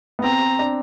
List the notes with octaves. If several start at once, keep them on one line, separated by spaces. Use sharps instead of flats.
B3
C4 A#5
D4